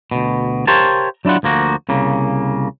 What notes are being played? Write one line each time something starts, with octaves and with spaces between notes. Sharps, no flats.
D2 B2
G4 A#4 C5 C#5 F5 A5
F#3 D4 E4 F4 F#5
D2 F3 A#3 F#4
C2 C#3 A#3